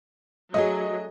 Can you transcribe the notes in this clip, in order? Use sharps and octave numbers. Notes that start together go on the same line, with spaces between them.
F#3 A3 D4 G#4 D#5